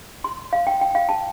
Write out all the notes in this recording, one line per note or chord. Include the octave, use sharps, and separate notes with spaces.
C6
F5
G5
G5
F5
A5